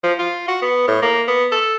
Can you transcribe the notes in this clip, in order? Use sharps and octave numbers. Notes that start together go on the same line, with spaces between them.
F3
F4
F#4
B3
A2
A#3
B3
A4